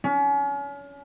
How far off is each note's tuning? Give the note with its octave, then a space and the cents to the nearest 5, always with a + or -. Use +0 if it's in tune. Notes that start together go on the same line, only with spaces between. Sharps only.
C#4 +35